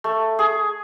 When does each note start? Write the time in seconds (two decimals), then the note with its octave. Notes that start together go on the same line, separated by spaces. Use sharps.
0.04 A3
0.39 G#4